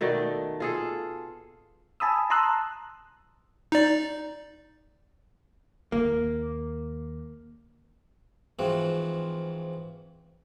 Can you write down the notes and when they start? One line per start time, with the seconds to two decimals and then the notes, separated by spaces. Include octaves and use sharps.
0.01 B2 D#3 A3 D5
0.60 F4 G#4 A4
2.00 G#5 A5 B5 D#6 E6
2.30 A5 A#5 C6 D#6 E6 F#6
3.72 D#4 D5
5.92 D#2 A#3
8.59 G#2 E3 F3 C4 F#4